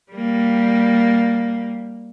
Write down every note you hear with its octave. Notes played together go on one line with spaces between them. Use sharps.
G3 A#3